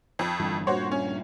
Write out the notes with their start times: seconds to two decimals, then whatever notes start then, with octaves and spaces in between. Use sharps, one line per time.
0.19 F2
0.40 G1 G2 E3
0.67 G2 A#2 F#4 C5 C#5
0.91 C#4